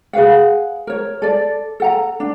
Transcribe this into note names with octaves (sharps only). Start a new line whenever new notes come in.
G#4 B4 F5 F#5
A#4 C#5
A4 D5
A4 F#5 A#5
D4